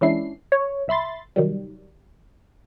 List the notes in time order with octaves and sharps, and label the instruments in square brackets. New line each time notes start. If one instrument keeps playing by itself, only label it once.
[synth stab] E3 G#3 C#4 D4 E4 C7
C#5
C2 E5 B5 C6 A6
C2 D#3 F#3 G3